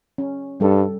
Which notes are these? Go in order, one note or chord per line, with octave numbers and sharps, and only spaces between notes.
C#4
G2 G3 A4